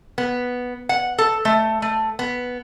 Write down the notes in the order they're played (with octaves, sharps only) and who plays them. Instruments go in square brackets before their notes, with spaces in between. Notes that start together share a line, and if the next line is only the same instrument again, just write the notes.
[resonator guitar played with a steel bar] B3
F#5
A4
A3
A3
B3